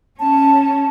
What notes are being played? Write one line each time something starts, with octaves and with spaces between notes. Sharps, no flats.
C#4 A5